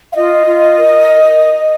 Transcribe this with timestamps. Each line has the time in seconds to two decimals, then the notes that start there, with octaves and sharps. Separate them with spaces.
0.12 F5
0.15 F4 D#5
0.46 F4
0.77 A#4